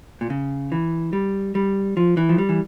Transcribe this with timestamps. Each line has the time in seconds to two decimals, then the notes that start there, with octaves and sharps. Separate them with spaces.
0.21 A#2
0.30 C#3
0.72 E3
1.13 G3
1.55 G3
1.97 F3
2.17 E3
2.29 F3
2.38 G3
2.49 E3